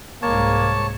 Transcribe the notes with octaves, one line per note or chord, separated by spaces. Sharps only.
C2 G#2 G#3 A#3 C#5 A5